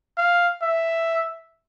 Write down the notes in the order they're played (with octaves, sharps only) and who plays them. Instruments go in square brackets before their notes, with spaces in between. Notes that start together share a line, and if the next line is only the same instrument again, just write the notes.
[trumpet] F5
E5